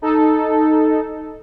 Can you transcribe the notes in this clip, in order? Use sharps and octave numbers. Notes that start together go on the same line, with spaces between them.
D#4 A4